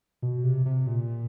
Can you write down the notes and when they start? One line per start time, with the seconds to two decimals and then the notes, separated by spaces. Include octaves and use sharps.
0.22 B2
0.44 C3
0.66 C3
0.87 A#2